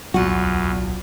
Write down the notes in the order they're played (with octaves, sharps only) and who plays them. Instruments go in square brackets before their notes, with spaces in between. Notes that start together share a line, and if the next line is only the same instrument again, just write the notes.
[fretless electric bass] D1 B1 F#3 [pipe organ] E2 [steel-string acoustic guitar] F4 F#5 [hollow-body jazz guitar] F#4